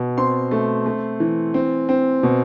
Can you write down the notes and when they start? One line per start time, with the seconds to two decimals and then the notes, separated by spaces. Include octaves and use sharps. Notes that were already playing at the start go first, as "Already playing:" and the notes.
Already playing: B2
0.17 C4 C6
0.51 A3
0.86 A3
1.20 E3
1.54 C4
1.89 C4
2.23 B2